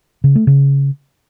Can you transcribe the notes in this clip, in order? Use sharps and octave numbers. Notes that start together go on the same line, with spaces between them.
C#3
A3
C#3